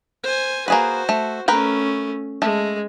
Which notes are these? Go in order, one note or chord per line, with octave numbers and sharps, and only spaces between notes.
C5 G#5
A#3 F#4 G#4 B4 C5
A3
A3 C#4 A#4 B4 G5
G#3 A3